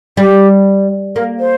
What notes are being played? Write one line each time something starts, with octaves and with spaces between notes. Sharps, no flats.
G3 G4
A#3 A#4
C5